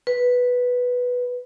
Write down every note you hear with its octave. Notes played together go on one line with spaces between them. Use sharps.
B4